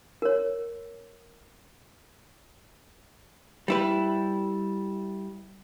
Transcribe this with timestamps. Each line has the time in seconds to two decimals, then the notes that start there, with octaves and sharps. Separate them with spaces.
0.22 A#4 C#5
3.68 G3 E4 B4